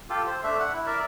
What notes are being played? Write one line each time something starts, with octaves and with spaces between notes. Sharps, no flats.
F4 G4 A4
C5
A3 D4 E5
F#5
E4
A#4 D5 E5